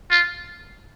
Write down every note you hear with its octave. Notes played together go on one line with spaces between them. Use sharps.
F4